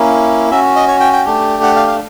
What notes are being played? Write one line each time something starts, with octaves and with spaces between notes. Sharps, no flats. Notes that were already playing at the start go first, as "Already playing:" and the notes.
Already playing: A#3 C#4 E4
C#4 F#4 E5
D#5
C#5
G5
G5
A3 D4 G4
F#5
F5
F5